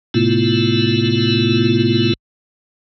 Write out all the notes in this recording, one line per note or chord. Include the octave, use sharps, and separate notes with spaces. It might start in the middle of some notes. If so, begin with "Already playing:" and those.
A2 C3 A3 B3 E4 F4